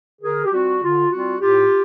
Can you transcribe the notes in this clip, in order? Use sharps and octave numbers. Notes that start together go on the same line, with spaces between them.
D3 G#4 A#4
G4
G3 C4 F4 F#4
D3 F4
G3 C4 F4 F#4
A2 F4 G4